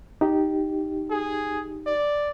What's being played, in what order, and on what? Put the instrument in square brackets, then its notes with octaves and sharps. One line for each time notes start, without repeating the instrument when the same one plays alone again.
[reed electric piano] D#4 G4
[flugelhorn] G#4
D5